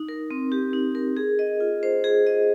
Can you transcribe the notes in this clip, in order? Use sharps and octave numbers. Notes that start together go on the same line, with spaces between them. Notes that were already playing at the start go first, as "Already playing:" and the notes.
Already playing: D#4
A#4
C4
G4
D#4
A#4
G#4
D#5
F4
C5
G#4
D#5